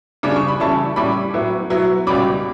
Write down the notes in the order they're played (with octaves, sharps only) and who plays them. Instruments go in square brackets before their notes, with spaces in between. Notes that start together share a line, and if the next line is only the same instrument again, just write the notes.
[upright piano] C#3 G3 D4 D6
C#6
B5
C#3 E3 G3 C#4 E4 A5 C#6
A2 G3 C#4 E4 B5 D6
A2 F#3 B3 E4
B2 F#3 B3 E4
C#2 B2 G3 C#4 B5 D6